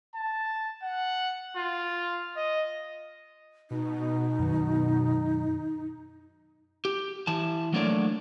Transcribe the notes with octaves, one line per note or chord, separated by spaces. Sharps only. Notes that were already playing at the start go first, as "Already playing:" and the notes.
A5
F#5
F4
D#5
B2 D#4
F#2 D#3
G4
E3 A5
F#3 A3 A#3 D4 C#5 D5